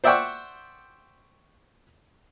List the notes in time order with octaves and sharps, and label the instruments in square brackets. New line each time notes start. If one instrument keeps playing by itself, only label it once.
[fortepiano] C5 D5 E5 F#5 G5 C#6